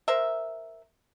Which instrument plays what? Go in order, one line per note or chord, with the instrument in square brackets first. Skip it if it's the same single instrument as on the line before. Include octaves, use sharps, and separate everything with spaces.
[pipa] A#4 C5 E5